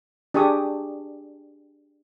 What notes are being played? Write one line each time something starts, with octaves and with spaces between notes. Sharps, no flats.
D4 G4 G#4 C#6 D#6